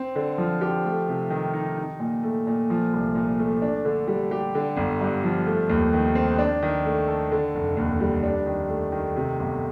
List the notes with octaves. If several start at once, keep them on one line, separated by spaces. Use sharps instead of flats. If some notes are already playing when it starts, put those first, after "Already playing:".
Already playing: C4
D3
F3
G4
A3
C3
D#3
D#4
D#4
A#2
A3
A#2
F3
C2
A#2
A3
D4
D3
G3
G4
D3
G1
G2
F3
A3
D#2
D#3
C4
D4
D#3
A3
A4
D3
F1
D#2
G3
D4
D#3
A3
D#3
C3
G1